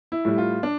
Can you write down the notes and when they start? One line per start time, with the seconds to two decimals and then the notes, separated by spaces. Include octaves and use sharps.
0.12 E4
0.25 A2 G3
0.38 F4
0.63 D4